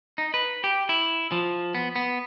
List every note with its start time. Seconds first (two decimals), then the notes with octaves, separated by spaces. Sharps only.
0.18 D#4
0.34 B4
0.64 G4
0.89 E4
1.32 F3
1.75 B3
1.96 B3